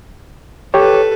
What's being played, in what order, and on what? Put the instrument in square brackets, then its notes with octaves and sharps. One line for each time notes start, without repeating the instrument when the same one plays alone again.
[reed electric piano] G4 C#5 [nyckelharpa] A4 B4